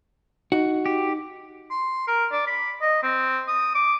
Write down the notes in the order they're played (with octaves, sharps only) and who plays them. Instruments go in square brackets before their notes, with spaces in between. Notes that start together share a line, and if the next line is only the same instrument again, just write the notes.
[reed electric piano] D#4 [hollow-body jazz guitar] F#4
[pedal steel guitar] G4
[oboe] C6
A#4
D5
B5
D#5
C4
D#6
D6